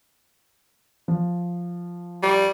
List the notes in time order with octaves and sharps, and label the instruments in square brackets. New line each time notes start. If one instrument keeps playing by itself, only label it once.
[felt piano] F3
[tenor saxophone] G3